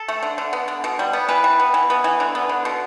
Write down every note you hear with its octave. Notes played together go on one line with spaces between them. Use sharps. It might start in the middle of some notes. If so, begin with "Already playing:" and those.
Already playing: A4
A3
D3
D3
B3
D3
B2
G3
B3
E3 B4
G3
B3
E3
B3
E3
D3
B3
D3
B2